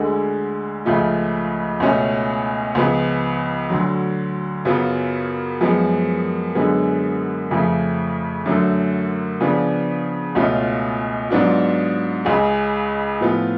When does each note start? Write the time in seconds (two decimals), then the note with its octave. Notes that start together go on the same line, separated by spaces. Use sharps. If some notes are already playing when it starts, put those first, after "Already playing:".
Already playing: D2 D3 G#3
0.85 C#2 C#3 F3 A3 F4
1.80 C#2 B2 A3 C#4
2.75 C#2 C#3 F3 B3
3.70 D2 D3 F#3
4.65 F#2 C#3 F#3 B3 F4
5.61 F#2 F3 G#3 B3
6.55 F#2 D3 G#3 B3
7.51 F2 C#3 F3 A3
8.46 F#2 D3 F#3 A3
9.41 C#3 F3 B3 D4
10.35 C#2 B2 A3 C#4 F4
11.30 G#2 F#3 B3 D4 F4
12.25 C#2 C#3 G#3
13.21 A2 F3 B3 F4